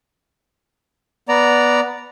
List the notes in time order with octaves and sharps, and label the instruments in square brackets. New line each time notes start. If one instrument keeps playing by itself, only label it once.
[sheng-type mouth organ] B3 D5 A#5